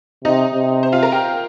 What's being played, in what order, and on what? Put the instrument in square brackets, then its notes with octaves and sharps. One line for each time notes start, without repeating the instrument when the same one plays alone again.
[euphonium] C3 [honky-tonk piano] D#4 D#5
[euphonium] C3
[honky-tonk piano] C5
F4 F5
A#4 A#5
G4 G5